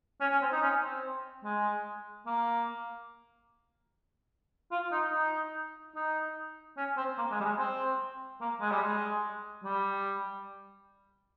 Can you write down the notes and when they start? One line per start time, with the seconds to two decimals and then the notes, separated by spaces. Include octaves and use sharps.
0.21 C#4
0.32 C#4
0.42 C4
0.52 D#4
0.62 C#4
0.82 C4
1.44 G#3
2.26 A#3
4.72 F4
4.92 D#4
5.13 D#4
5.95 D#4
6.77 C#4
6.97 C4
7.18 A#3
7.31 G#3
7.40 G3
7.45 G#3
7.59 C4
8.41 A#3
8.61 G#3
8.72 G3
8.83 G#3
9.64 G3